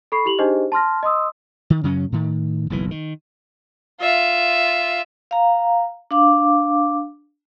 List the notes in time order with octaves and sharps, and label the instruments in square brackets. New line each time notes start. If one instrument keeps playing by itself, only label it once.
[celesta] A4 B5 C#6 C7
E4 G4 F7 F#7
D4 D#4 G4 G#4 C5 D#5
A5 C6 F6 A#6
D#5 C6 D#6 E6
[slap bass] D#3
F#2 C#3 F#3 C#4
A2 D#3
F#1 B1 C3 E3
D#3
[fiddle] F4 E5
[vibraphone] F5 A#5
D4 F5 D6